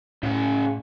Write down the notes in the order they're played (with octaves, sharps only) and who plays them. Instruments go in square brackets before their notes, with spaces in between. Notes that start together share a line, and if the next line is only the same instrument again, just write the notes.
[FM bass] A2 [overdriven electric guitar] C#3 F#5